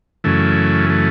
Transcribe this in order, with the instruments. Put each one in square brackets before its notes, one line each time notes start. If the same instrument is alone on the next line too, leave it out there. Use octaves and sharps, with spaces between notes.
[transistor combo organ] F#2 C#3 E3 A3
A3